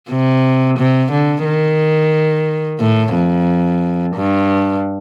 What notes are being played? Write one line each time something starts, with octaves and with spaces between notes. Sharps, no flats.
C3
C3
D3
D#3
A2
F2
G2